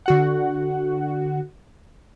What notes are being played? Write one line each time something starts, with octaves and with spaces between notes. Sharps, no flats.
D3 F#4 F#5